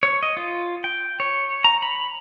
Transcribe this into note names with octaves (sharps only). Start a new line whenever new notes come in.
C#5
D#5
F4
G5
C#5
A#5
B5